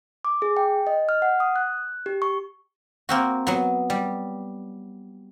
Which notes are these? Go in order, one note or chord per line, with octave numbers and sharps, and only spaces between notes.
D6
G#4
G5
D#5
F6
F#5
D#6
F#6
G4
C#6
A#3 C4 F#4
F#3 B3
G3